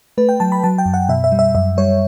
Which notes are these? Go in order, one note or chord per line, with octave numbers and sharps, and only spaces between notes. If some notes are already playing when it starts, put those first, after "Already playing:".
A3 B4
G5
F#3 A5
B5
F#3 A5
G5
F#2
F#5
B2 E5
E5
G3
E5
F#2 E5
G3 C#5